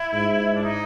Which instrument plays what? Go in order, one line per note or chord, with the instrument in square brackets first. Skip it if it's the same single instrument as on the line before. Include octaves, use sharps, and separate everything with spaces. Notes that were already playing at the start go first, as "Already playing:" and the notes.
Already playing: [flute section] E4
[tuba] G#2
[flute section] D4
D#4